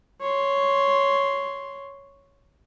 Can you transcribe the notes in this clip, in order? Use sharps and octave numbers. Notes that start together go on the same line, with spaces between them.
C#5 C6